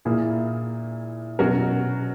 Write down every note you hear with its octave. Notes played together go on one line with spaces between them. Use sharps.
A#2 A#3 E4 G#4
B2 F#3 C#4 F#4 A#4